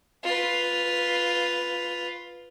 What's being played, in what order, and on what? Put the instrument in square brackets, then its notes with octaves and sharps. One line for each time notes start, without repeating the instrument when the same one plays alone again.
[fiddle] F4 B4